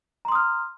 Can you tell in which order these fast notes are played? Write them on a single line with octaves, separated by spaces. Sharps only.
A#5 C6 D#6 F6